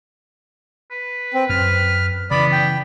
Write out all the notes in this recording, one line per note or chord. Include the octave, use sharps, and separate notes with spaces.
B4
C4
F#2 F6
C#3 E3 B3 D5 B5
G5